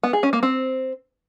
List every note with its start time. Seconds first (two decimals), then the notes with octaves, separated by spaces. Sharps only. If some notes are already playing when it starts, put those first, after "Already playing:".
0.03 B3
0.13 G#4
0.23 C#4
0.33 A#3
0.43 C4